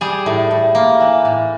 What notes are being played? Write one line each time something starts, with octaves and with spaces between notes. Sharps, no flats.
G3 G#4
A2
A2
A#3
E3
A2